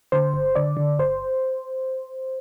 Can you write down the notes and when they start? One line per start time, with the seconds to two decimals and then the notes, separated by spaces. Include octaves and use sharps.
0.12 D3 C5
0.34 G1
0.55 D3 D5
0.77 D3
0.99 G1 C5